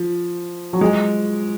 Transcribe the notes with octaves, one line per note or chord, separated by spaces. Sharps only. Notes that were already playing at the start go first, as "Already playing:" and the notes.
Already playing: F3
F#3
G#3